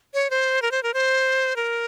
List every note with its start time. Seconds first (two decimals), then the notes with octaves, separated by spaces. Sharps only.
0.14 C#5
0.30 C5
0.62 A#4
0.71 C5
0.83 A#4
0.94 C5
1.56 A#4